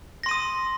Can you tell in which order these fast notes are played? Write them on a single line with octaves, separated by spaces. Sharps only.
A#6 C6 D#7 D#6